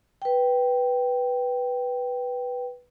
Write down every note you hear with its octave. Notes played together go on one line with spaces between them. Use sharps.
B4 G5